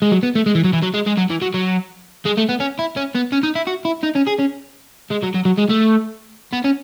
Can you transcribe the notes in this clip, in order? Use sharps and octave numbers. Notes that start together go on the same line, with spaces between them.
G#3
F#3
B3
A3
G#3
E3
F#3
E3
F#3
G#3
G#3
F#3
E3
F#3
F#3
G#3
A3
B3
C#4
E4
C#4
B3
C#4
D#4
E4
F#4
E4
D#4
C#4
G#4
C#4
G#3
F#3
F#3
F#3
G#3
A3
B3
C#4